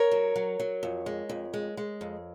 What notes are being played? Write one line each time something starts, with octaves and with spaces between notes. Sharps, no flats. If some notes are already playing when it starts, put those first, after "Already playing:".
Already playing: A#4 C#5
F#3
F#3
F#3
F2
G#3
F2
G#3
G#3
F2